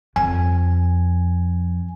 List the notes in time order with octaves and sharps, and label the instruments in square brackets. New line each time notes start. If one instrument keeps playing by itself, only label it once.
[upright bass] F2 [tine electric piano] G#5